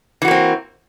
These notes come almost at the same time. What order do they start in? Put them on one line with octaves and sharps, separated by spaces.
E3 F#4 A#3 C4